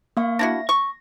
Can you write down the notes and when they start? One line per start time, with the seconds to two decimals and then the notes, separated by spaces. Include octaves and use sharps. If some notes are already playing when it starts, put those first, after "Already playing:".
0.17 A#3 F5 C#6
0.39 D4 E4 F#4 A#6
0.69 C#6